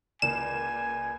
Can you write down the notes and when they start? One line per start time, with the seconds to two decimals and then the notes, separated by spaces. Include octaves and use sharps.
0.22 C#2 A#3 D5 G#5 E7